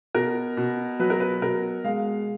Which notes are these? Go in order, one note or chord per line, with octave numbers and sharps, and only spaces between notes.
B2 A#4
B2
F#3 B4
A#4
B4
B2 A#4
G#3 F5